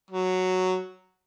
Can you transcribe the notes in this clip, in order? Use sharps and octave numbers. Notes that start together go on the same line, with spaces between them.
F#3